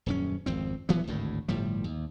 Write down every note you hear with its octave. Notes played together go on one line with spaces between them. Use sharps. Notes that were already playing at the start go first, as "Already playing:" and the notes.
D#1 F#2 C#4
G#1 F2 C4
D#1 E3 F#3 B3
G#1 D2 A2
G1 A2 F3 G3
D#2